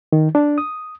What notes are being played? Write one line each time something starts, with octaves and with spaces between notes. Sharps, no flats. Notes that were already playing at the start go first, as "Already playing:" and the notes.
D#3
D4
D#6